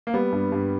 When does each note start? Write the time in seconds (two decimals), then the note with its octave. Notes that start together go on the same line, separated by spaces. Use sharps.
0.07 A#3
0.14 G3 B3
0.32 G2
0.52 G2